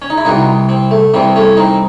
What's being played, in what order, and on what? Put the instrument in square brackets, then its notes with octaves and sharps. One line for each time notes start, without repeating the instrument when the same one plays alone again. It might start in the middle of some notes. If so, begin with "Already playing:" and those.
[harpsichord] C#4
D#4
E4
C2 C3 E3 D#4 F#4
C4
A3
C2 C3 E3 C4
A3 C#4
C4 D#4